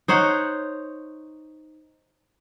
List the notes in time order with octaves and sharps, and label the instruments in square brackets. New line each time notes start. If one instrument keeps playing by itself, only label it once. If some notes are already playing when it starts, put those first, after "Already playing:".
[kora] D#4 C5 C#5 F#5